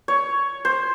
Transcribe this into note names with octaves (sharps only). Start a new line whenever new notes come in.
C#5
C5